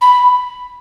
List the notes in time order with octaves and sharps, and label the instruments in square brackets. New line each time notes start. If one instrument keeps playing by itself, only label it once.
[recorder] B5